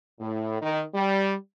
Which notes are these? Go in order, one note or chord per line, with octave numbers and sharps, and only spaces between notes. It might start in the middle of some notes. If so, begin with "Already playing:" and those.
A2
D#3
G3